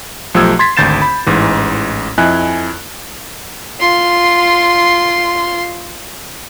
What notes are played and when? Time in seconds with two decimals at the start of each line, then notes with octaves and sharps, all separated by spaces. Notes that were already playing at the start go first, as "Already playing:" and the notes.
0.34 B1 F3 A3 G4 E6 G#6
0.59 C6 G#6 A6 B6
0.77 G#1 D2 G6 A6 C7 E7
1.02 B5
1.26 A1 G#2 E3
2.18 F2 E4 D#5 G#5 F#6
3.80 F4 C6